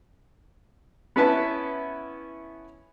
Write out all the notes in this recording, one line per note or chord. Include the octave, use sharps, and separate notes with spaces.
B3 C#4 E4 B4 E5 A5